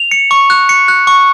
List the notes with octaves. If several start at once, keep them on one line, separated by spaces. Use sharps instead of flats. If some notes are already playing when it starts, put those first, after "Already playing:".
Already playing: F7
C#7
C#6
F#6
C#7
F#6
C#6